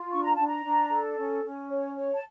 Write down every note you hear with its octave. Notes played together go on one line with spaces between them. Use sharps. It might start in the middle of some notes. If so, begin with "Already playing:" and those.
Already playing: F4
D4 C#6
A#5
D4 A5
A#5
D4
A4
C#4
C#4
C#5
C#5
A5